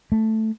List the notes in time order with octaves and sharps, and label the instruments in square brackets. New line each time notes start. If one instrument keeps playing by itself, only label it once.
[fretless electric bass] A3